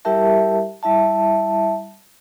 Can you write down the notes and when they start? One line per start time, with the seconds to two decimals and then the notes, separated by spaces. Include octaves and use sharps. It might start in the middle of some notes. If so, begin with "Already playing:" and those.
0.05 G3 E4 G4 A#4 E5 A5
0.83 G3 E4 E5 A5